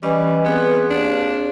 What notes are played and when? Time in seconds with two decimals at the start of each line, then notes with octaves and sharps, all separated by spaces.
0.03 E3 G3 C#4 D#5
0.45 B3 C4 G#4
0.90 D#2 D4